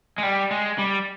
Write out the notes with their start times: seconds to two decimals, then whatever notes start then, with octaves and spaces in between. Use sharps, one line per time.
0.18 G#3
0.23 G3
0.51 G#3
0.78 G3